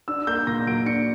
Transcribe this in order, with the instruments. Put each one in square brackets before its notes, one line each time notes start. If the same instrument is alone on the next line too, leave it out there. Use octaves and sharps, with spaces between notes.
[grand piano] D4 E6
A#3 G6
A#2 A#6
F#3 D7
D4 C#7